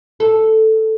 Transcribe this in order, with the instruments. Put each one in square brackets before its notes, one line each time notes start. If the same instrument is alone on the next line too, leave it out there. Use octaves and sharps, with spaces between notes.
[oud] A4